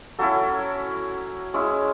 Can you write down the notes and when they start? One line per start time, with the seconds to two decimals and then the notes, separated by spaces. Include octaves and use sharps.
0.19 F#3 C#4 E4 A4
1.54 G#3 C#4 E4